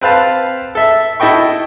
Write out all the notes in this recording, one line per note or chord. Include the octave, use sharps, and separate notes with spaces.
C4 B4 F5 A5
A4 E5
E4 A4 D#5 G5 C#6